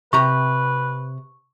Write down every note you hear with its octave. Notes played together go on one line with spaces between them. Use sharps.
C3 G4 B4 A#5 C#6